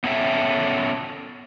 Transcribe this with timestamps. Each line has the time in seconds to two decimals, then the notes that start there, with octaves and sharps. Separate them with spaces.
0.04 B3 C#4 A4 E5 G5